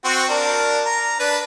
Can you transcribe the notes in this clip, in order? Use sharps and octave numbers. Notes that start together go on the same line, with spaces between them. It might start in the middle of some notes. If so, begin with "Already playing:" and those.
C4 F#4
D4 A#4
A#5
D4 B4